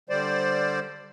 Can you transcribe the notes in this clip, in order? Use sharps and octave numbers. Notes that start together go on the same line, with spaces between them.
D3 G3 C5 D5